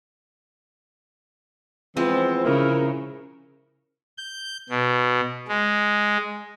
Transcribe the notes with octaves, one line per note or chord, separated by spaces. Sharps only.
E3 F3 G#3 B3 C4
C#3 E4 A#4
G6
B2
G#3